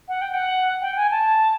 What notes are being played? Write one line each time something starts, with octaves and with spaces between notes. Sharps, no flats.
F#5
G5
F#5
G5
G#5
A5